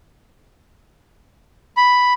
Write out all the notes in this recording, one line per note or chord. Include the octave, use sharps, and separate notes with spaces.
B5